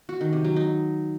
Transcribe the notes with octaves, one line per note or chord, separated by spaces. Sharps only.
F#4
D#3
C3
F#3
D#4